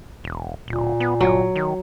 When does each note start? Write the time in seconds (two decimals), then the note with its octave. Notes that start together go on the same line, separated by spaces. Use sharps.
0.24 E1
0.68 D1 A#2
1.00 B3
1.21 G1 F#3
1.56 D#3